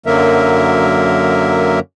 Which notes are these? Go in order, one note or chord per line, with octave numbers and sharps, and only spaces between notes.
F#2 D3 F#3 A#3 A#4 E5